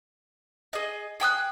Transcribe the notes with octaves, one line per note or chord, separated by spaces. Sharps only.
G#4 D#5
G#4 G5 D#6 F#6